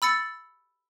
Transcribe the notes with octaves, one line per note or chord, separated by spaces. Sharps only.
B5 E6 A6 C#7